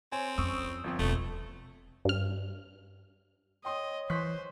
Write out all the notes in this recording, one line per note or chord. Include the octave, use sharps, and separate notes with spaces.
C4 C#5 G#5
F2 C#4 C#6 D#6 E6
G1 F3 C4
E1 A3
G2 F6
C#5 D#5 G5 C6 D#6
E3 C5 C#6 F#6 B6